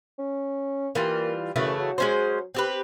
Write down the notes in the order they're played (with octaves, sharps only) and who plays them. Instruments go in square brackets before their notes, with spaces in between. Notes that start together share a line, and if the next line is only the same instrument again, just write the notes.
[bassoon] C#4
[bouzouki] E3 G3 F4 [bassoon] A#3
[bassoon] F#2 [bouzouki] C#3 E3 A3
[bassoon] F#3
[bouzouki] G#3 C#4 C5
C4 G4 B4